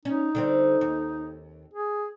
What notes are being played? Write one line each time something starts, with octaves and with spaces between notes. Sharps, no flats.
C#4 D#4
D3 G3 C4
D#2
G#4